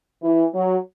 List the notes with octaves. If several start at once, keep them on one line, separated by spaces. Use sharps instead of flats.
E3
F#3